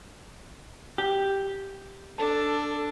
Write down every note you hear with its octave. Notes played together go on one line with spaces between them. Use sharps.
G4
D4 A4 A5